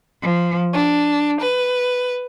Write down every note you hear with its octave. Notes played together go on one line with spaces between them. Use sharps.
F3
D4
B4